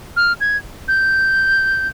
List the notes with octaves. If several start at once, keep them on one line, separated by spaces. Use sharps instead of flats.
F6
G#6
G6